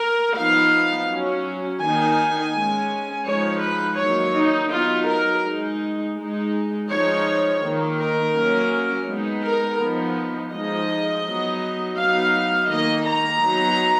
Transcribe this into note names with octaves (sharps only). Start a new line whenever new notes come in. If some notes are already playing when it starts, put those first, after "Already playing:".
Already playing: A#4
F3 B3 D#4 F5
F#3 C#4
D#3 A#3 D#4 G#5
G#3 C#4
F3 G#3 D#4 C#5
B4
D#3 F#3 A#3 D#4 C#5
D#4
F#3 B3 D#4 F4
A#4
G#3 D#4
G#3 D#4
F3 G#3 D#4 C#5
D#3 A#3 D#4
A#4
F#3 A#3 C#4
G#3 B3 D#4
A#4
F3 B3 D#4
F3 G#3 D#4 D#5
F#3 B3 D#4
F#3 B3 D#4 F5
D#3 A#3 D#4 D#5
A#5
F#3 B3 D#4